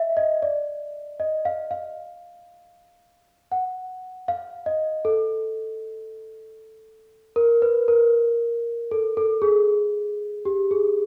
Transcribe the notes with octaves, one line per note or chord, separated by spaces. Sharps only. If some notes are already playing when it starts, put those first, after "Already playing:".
Already playing: D#5 E5
D#5
D5
D#5
F5
F5
F#5
F5
D#5
A4
A#4
B4
A#4
A4
A4
G#4
G4
G#4